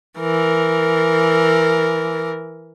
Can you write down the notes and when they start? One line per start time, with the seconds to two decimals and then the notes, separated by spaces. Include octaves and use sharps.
0.19 E3 A#4